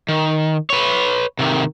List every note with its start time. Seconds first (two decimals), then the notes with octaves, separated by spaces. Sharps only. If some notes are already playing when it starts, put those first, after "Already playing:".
0.09 D#3
0.70 B4 C#5
1.39 C3 D#3